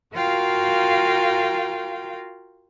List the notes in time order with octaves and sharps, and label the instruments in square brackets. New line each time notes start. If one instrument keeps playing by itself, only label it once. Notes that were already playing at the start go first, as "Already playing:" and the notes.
[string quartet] F4 F#4 A#4 F5 G5